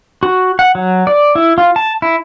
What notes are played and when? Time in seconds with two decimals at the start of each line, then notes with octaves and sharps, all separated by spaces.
0.23 F#4
0.59 F#5
0.75 F#3
1.07 D5
1.35 E4
1.58 F4
1.76 A5
2.02 E4